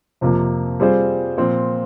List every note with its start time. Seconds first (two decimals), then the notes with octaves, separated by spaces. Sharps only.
0.21 F2 C3 F3 A#3
0.80 G3 C4 F4 G#4 C5
1.38 A#2 F3 C4